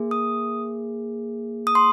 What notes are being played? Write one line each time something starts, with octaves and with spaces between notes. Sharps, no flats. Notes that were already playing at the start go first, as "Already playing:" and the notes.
Already playing: A#3 G#4
D#6
D#6
C6